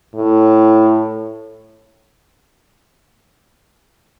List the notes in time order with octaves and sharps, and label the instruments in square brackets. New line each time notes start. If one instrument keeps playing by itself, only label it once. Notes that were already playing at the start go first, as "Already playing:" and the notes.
[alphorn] A2